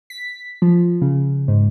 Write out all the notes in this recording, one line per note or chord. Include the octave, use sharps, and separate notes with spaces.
B6
F3
C#3
G#2